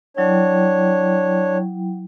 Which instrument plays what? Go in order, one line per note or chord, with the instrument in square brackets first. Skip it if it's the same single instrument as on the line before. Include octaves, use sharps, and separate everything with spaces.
[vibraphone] F#3 E4 G5 [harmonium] D4 C#5